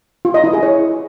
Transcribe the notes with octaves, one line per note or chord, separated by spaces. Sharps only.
F4
D#5
E4
G#4
C#5